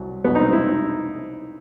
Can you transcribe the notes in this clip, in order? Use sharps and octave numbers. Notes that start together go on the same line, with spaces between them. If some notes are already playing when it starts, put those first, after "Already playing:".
Already playing: C2 F#3
C2 B2 F#3 B3
D#4
C4
E4